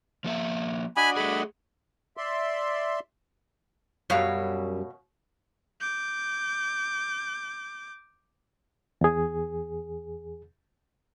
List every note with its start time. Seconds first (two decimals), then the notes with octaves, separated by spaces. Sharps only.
0.24 F3 A#3 E5
0.97 D4 F#4 D#5 G#5 B5
1.17 A3 G#4 B5
2.17 D5 E5 C6
4.10 F#2 B2 G3 C#5 F5
5.80 D6 G6
9.01 E2 G#4